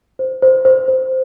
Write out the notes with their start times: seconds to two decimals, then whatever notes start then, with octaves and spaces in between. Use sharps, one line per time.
0.19 C5
0.42 C5
0.65 C5
0.88 C5